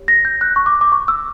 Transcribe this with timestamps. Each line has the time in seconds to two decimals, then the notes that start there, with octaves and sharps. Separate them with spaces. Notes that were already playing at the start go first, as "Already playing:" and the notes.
Already playing: G4 C#5
0.08 A#6
0.25 G6
0.41 F#6
0.56 C#6
0.66 D6
0.81 D6
0.92 C#6
1.08 E6